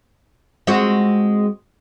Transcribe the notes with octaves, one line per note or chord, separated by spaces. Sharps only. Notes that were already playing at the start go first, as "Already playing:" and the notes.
G#3 C4 F#4